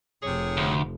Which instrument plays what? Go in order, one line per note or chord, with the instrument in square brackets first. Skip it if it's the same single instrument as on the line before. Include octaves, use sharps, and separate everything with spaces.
[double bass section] F1 [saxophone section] C3 G#4 C#5
[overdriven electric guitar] D2